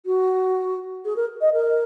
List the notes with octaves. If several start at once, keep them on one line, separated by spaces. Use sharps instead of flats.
F#4
G#4
A#4
D#5
A#4